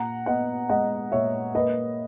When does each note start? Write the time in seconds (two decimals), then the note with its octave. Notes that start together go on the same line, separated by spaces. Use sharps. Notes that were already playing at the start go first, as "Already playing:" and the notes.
Already playing: A#2 F#5 A#5
0.26 B3 D#5 F#5
0.69 G#3 D#5 F#5
1.12 A#2 C#5 E5
1.55 A#3 B4 D#5